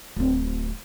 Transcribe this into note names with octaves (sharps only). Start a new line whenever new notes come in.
D1 C4